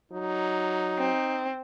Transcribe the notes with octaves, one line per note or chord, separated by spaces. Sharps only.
F#3 D#4
C4